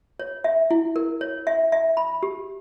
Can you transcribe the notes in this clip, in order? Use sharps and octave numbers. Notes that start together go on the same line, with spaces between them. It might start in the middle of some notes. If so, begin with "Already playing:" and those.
C#5
E5
E4
A#4
C#5
E5
E5
B5
G4